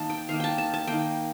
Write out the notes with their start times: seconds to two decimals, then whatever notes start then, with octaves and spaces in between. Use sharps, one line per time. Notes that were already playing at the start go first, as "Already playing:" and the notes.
Already playing: D#3 A#3 A5
0.10 G5
0.29 D#3 A#3 F5
0.40 G5 A5
0.58 A5
0.74 A5
0.87 D#3 A#3 G5